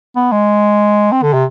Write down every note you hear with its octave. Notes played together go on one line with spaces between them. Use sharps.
B3
G#3
C4
D3
C3